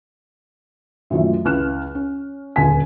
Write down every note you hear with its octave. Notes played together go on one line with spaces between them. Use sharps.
F#2 A#2 D#3 E3 A3
C#2 E4 F6 F#6 E7
C#4
D#1 C#2 D3 G#4 G#5 B6